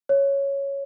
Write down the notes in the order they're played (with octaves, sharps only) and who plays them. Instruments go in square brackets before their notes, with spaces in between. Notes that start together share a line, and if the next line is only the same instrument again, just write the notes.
[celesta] C#5